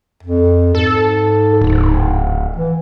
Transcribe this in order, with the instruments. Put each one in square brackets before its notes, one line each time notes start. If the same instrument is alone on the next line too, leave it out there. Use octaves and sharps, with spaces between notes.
[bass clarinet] F2
[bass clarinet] G#2 [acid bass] A4
[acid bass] D1
[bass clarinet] E3